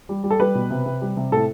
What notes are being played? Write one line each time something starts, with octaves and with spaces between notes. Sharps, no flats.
G3
G3
A4
G3 B4
B2
C3
C3
G3
C3
A2 A4